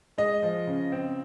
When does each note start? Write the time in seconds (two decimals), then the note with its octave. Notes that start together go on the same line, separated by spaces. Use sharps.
0.18 G#3 D#5
0.42 F3
0.67 C#3
0.92 C4